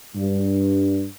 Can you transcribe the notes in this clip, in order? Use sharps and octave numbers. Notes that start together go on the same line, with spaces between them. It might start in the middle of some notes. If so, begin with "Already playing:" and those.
G2